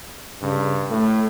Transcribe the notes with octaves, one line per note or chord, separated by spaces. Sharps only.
G2 C#3
A2 A3